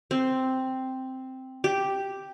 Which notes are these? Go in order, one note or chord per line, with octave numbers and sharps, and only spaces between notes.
C4
G4